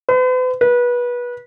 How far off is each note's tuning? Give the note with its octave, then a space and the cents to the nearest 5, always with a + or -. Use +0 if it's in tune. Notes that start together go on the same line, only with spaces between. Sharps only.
B4 +45
B4 -25